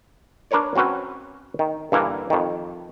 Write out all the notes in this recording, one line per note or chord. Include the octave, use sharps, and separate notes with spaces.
D4 A#4 B4 C#5 D5
F#3 C4 C#4 F#4 B4
D#3
G2 D3 E3 A#3
F2 D#3